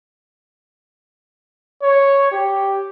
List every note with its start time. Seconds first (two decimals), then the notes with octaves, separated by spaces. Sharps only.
1.82 C#5
2.32 G4